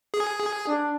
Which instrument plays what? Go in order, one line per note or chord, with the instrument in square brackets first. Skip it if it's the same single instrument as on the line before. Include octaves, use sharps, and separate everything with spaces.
[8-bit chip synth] G#4
[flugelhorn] D4